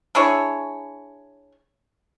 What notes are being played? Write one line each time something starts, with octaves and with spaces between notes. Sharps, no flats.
D4 E4 G#4 C#5